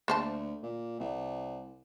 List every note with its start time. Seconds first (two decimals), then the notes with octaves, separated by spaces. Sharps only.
0.08 D2 A#3 C5 A5
0.63 A#2
0.99 C2